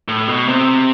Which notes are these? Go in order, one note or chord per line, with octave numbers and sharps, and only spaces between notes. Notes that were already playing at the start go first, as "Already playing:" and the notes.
A2
B2
C3